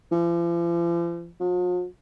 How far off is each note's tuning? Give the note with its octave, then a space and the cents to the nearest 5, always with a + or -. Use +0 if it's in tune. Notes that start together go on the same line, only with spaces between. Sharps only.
F3 -45
F3 +45